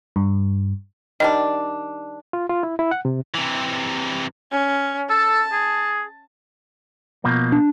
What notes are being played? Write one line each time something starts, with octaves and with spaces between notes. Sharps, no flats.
G2
D#3 G3 D4 D#5
F4
F4
E4
E4
F#5
C3
C3 E3
C#4
A4 A5
G#4
B2 F3 A#3
D4